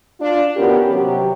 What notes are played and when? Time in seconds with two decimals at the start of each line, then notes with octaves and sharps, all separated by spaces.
0.20 D4 F4
0.56 D#3 B3 C#4 F#4 G4 A#4
0.91 C3 F#3 G4